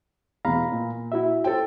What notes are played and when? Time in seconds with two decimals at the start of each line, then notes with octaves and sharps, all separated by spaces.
0.45 E2 B2 F5 A#5 B5
0.72 A#2
1.12 E4 F#4 E5
1.44 A4 C5 G5